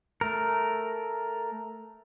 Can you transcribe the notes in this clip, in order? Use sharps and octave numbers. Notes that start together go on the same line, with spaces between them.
A3 A#4